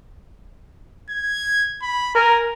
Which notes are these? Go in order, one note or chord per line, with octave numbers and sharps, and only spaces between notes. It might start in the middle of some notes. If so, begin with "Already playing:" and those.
G#6
B5
A#4 G#5